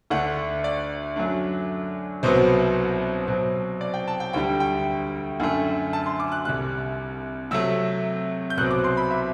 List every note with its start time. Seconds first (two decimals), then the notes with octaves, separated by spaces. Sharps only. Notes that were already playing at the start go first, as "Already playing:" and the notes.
0.10 D2 D3 A3 D4 F#5
0.64 D5
1.16 F#2 F#3 A3 D4
2.23 C2 B2 F#3 B3 C5
3.28 B2 F#3 C4
3.81 D5
3.94 G5
4.08 A5
4.20 G5
4.33 D2 D3 G3 G5
4.60 G5
5.40 F#2 D3 A3
5.93 A5
6.06 C6
6.20 D6
6.32 F#6
6.45 C2 C3 G3 F#6
7.51 C3 F#3 A3 E6
8.50 G6
8.57 C2 B2 F#3 C4 F#6
8.71 D6
8.84 C6
8.97 B5
9.11 E5